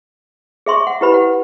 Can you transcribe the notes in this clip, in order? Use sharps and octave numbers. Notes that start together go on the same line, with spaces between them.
G#4 E5 C6 C#6
F#5
E4 G4 B4 B5
F#5